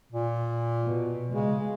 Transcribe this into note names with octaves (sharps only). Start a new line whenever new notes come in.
A#2
B2
C#3 G#3